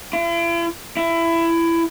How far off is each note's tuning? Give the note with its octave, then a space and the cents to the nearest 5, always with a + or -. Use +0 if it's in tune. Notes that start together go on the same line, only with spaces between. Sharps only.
E4 +45
E4 +20